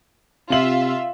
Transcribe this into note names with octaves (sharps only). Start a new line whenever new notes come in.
C3 F4 E5 F#7